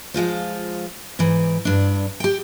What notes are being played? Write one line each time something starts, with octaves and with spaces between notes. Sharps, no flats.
F3 G#3 F4 C5
G#2 E3
G2 D4
G4 G5